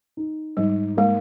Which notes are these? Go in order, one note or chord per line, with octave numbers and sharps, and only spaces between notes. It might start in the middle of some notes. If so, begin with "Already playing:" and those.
D#4
G#2 G3
G#3 A#3